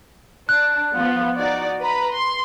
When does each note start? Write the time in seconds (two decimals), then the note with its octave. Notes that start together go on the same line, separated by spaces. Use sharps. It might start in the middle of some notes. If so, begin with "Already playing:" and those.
0.49 D4 F#6
0.96 F3 B3 F4
1.37 D#4 F#4 D5
1.81 B4 A#5 B5
2.13 C6